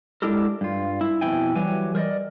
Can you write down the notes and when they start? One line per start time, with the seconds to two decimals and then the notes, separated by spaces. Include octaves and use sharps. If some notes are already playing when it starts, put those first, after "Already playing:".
0.22 G#3 D4 E4 G4 A4 A#4
0.61 G2 F4
1.01 E4
1.21 F2 B2 E3 E4 G5 G#5
1.55 E3 F#3 G3 G4 G#5
1.95 A#4 C5 D5 D#5